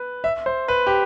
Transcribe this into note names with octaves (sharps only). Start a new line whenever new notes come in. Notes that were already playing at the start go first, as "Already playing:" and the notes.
Already playing: B4
E5
C5
B4
G4